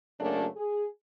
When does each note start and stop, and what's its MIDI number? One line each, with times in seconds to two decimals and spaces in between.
0.20 0.47 42
0.20 0.47 49
0.20 0.47 54
0.20 0.47 57
0.20 0.47 58
0.20 0.47 62
0.57 0.85 68